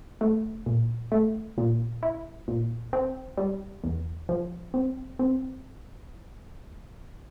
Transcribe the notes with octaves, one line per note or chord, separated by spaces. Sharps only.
A3
A#2
A3
A#2
E4
A#2
C4
G3
E2
F3
C4
C4